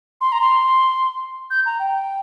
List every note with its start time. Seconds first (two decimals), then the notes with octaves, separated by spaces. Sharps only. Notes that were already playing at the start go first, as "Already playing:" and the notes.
0.21 C6
0.32 A#5
0.41 C6
1.50 G6
1.66 A#5
1.79 G5